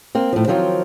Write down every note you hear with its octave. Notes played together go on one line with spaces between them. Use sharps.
A#3 C4
A2 F3
D#3 F3 F#3 C4 F4